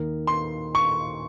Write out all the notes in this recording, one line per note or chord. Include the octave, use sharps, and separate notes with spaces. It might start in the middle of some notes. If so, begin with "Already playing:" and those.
Already playing: D#2 D#3 A#3 D#4 A#4
C6
C#6